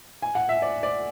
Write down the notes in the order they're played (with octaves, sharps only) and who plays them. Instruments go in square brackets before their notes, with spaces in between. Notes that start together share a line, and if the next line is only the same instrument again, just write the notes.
[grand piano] G#5
F#5
E5
D5
D5